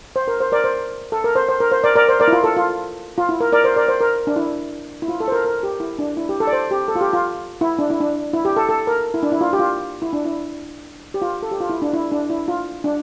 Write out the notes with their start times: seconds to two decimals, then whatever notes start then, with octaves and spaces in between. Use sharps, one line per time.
0.16 C5
0.28 A#4
0.41 C5
0.52 A#4 D5
0.64 C5
1.12 A4
1.24 A#4
1.35 C5
1.49 C5
1.60 A#4
1.72 C5
1.84 A#4 D5
1.96 A#4 D5
2.09 C5
2.20 A#4 D5
2.28 E4
2.33 F4
2.44 A4
2.57 F4
3.18 F4
3.29 E4
3.40 A#4
3.52 A#4 D5
3.64 C5
3.76 A#4 D5
3.89 C5
4.01 A#4
4.27 D4
4.36 E4
5.02 E4
5.08 F4
5.20 A4
5.28 C5
5.32 A#4
5.45 A#4
5.63 G4
5.80 E4
5.99 D4
6.17 E4
6.29 G4
6.40 A4
6.47 D5
6.53 C5
6.71 G4
6.88 A4
6.95 F4
7.01 G4
7.13 F4
7.61 E4
7.79 D4
7.90 E4
8.00 D4
8.33 E4
8.45 G4
8.57 A4
8.69 A4
8.87 A#4
9.14 E4
9.23 D4
9.32 E4
9.41 F4
9.53 G4
9.59 F4
10.02 E4
10.13 D4
10.26 E4
11.14 G4
11.22 F4
11.43 A4
11.51 G4
11.60 F4
11.70 E4
11.82 D4
11.93 E4
12.12 D4
12.30 E4
12.48 F4
12.84 D4